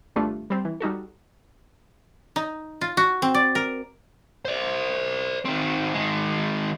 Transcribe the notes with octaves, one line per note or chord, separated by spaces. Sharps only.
G#1 G2 A3 D4 F4
G3 C4
E3
G3 D#4 F#4 A4
D#4
F4
F#4
C4
D5
A#4
C5 D5
D#3 C4
D#3 G#3